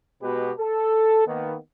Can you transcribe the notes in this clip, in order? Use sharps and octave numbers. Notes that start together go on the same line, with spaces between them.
B2 G#3 B3 F#4 G4 B4
A4
D#3 A#3 B3